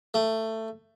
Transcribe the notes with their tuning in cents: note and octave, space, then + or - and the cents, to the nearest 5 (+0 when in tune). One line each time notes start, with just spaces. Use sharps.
A3 +15